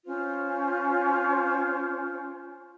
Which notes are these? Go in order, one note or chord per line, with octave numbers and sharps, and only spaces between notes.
C#4 F4 C5